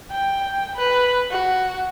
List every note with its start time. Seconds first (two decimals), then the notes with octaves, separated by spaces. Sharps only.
0.11 G5
0.76 B4
1.31 F#4